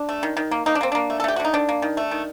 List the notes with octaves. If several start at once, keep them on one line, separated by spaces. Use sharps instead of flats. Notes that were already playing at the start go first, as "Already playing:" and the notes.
Already playing: D4
A3
D#3
D#3
A#3
A#3 D#4
D4
A#3 C4
A#3 D4
A3
A4
A3 G4
F#4
D3 D#4
D#3 D4
A#3
D#3
A3
D#3